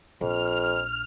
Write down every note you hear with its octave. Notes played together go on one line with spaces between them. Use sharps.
A#1 F2 F6